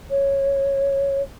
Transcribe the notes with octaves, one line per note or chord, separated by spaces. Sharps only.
C#5